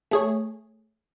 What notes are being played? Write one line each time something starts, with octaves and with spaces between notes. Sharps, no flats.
A3 G#4 C#5